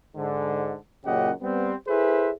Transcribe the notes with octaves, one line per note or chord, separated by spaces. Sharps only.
G#2 D3
F#2 A#2 C#3 G4 D#5 F#5
G3 B3 C4
E4 G#4 A4 B4 C5 E5